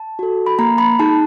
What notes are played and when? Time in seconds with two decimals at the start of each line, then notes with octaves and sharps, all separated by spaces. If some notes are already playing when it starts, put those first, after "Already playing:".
Already playing: A5
0.19 F#4 A4
0.46 B5
0.59 A#3 A#5
0.78 B5
0.99 D#4 G#4 A5